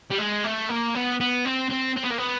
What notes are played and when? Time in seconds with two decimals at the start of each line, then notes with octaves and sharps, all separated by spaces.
0.11 G3
0.19 G#3
0.45 A3
0.69 A#3
0.95 B3
1.20 B3
1.46 C4
1.71 C4
1.97 C4
2.04 B3
2.11 A#3
2.18 B3